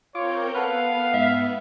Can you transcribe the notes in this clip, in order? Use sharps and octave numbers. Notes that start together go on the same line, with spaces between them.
C4 F4 A#4 C#5 D6 G6
B3 A4 B4 F5 F#5 F6
G#2 E5